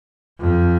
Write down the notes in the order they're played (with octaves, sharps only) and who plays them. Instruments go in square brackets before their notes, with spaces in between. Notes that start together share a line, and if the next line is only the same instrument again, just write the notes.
[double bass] F2